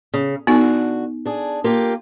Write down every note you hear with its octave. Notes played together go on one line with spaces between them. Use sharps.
C#3
D3 B3 D#4 F#4
D4 G#4
A#3 F4 G4